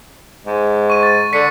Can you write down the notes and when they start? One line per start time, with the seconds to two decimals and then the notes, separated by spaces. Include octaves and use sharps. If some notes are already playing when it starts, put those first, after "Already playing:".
0.46 G#2
0.90 C#6 D#7
1.03 A6
1.33 D3 B6 C#7